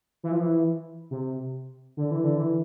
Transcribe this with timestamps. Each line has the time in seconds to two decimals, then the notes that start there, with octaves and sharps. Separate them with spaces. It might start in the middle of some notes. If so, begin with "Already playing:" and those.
0.23 E3
0.32 F3
0.40 E3
1.11 C3
1.97 D3
2.11 E3
2.24 D3
2.38 E3